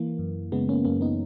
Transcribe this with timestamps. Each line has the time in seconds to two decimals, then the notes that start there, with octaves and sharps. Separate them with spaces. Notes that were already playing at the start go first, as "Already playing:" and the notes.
Already playing: E3 A#3
0.19 F#2
0.52 C#3 G#3 B3
0.69 A#3 C#4
0.85 F#2 A#3 C#4
1.01 B3 D#4